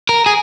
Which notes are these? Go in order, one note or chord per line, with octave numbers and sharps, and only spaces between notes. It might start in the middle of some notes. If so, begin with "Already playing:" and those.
A#4
G#4